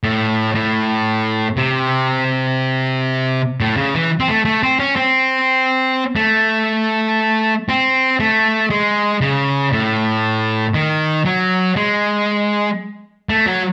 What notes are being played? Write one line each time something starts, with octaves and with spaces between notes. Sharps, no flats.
A2
A2
C3
A2
C#3
E3
C4
A3
A3
C4
C#4
C4
A3
C4
A3
G#3
C#3
A2
D#3
F#3
G#3
A3
F#3